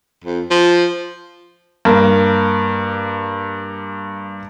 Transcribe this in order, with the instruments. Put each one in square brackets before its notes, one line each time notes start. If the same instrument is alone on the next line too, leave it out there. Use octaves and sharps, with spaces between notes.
[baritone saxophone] F2
F3
[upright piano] G2 A#3